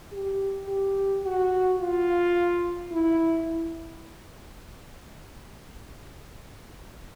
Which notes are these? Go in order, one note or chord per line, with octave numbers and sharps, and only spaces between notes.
G4
G4
F#4
F4
E4